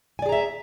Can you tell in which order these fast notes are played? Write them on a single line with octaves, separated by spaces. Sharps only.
G#5 D5 G#4 A#5 E5